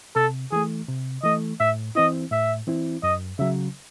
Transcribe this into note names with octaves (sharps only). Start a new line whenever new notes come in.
C3 A4
E3 A3 G#4
C3
E3 A3 D#5
A2 E5
E3 C4 E4 D#5
A2 E5
E3 C4 E4
F#2 D#5
C#3 F#3 E5